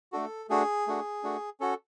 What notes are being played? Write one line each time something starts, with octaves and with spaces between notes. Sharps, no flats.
A3 D4 F#4 A4
A3 D4 F#4 G#4
A3 D4 F#4
A3 D4 F#4
C#4 F#4 A4